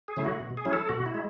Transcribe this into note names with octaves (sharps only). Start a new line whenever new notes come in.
G#4
C#3 F#3 A3 E4
F#4
B2
G#4
F#3 C#4 E4
A4
B2 F#4
E4
G#3